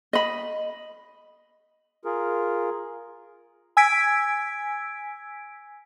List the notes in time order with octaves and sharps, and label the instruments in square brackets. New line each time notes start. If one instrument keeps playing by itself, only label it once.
[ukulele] D#5 B5
[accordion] F4 G#4 A#4
[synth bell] G#5 E6 G#6 B6 D7